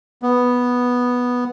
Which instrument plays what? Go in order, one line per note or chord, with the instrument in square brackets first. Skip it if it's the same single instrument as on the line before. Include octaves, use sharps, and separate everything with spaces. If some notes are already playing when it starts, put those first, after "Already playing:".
[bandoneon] B3